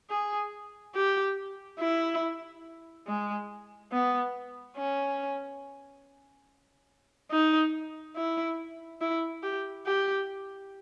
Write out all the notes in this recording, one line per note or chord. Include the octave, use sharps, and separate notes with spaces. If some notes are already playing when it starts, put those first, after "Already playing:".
G#4
G4
E4
G#3
B3
C#4
D#4
E4
E4
G4
G4